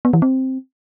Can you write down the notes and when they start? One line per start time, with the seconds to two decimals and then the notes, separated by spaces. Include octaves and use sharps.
0.05 B3
0.13 E3
0.22 C4